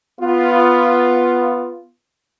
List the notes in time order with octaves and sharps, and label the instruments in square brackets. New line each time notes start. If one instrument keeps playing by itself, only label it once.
[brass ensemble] B3 F4